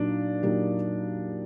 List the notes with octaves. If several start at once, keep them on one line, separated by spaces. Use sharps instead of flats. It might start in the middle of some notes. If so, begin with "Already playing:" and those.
Already playing: A#2 F#3 A#3 D4 D#4
A#2 F#3 A#3 D#4 G4